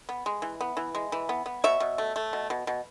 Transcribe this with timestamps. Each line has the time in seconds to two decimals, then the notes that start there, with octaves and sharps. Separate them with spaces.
0.09 B3
0.26 G#3
0.42 E3
0.61 B3
0.77 E3
0.95 G#3
1.12 E3
1.29 B3
1.46 B3
1.64 B2 C#5 E5
1.80 B2
1.98 A3
2.16 A3
2.33 B2
2.50 B2
2.67 B2